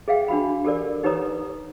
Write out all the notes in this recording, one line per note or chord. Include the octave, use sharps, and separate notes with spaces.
G#4 E5 F5 G5
D4 F#4 B5
G4 A4 A#4 D5
D#4 G4 B4 C#5 A#5 D#6